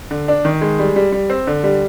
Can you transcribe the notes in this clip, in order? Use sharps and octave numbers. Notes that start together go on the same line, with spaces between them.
D3
D4
D#3
G#3
G3
G3
G3
C4
D3
G3